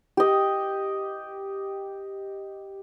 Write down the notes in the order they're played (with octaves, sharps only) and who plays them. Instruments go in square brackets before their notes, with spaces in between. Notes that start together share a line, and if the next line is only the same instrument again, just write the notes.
[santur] G4 D#5